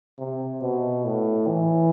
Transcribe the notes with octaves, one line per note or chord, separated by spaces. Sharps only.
C3
B2
A2
E3